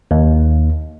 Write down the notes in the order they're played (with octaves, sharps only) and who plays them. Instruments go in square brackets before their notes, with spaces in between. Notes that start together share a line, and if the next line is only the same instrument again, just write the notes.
[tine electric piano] D#2